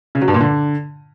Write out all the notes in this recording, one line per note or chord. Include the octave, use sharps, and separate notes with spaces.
C#3
F#3
G2
A#2
D3